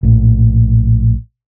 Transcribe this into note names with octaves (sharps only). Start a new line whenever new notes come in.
A#1 A2